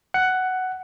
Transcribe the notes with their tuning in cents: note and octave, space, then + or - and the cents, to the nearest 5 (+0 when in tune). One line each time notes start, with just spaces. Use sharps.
F#5 +10